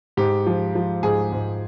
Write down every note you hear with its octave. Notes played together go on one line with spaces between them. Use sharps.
G#2 G4
F3
F3
G#2 G#4
G#2